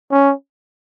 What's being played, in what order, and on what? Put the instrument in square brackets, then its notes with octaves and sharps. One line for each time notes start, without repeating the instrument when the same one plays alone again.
[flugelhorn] C#4